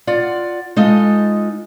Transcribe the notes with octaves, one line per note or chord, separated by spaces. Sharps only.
F4 D5 F#5
G#3 D#4 F4 A4 D#5